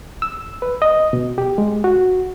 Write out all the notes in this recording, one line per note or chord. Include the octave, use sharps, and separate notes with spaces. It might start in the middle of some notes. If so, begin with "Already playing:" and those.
E6
B4
D#5
B2
G4
G#3
F#4